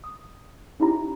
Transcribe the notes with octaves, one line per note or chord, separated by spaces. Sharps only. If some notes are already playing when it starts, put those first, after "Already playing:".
D#6
C#4 D#4 E4 G4 A#5